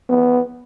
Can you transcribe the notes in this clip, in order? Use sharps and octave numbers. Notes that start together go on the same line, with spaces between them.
B3